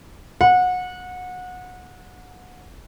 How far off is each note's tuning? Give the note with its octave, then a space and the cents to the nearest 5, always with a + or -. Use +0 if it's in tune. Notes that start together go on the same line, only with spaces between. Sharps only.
F#5 -25